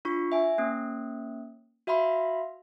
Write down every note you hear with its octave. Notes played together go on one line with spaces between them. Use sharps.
D4 F4 C#6
E5 G#5
A#3 C#4
F#4 E5 F5 B5 C6